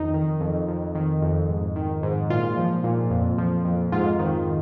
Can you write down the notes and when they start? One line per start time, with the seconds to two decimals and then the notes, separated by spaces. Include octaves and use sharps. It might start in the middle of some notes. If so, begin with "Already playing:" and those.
Already playing: F2 D#3 D#4
0.14 D#3
0.41 F2
0.68 F2
0.95 D#3
1.22 F2
1.49 G#2
1.76 D#3
2.03 G#2
2.30 A#2 F4
2.57 F3
2.84 A#2
3.10 F2
3.38 F3
3.65 F2
3.92 G#2 F4
4.19 D#3